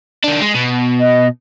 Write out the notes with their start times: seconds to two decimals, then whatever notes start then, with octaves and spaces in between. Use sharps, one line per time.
0.24 D#3 D4
0.41 G#3
0.55 B2
0.99 D#5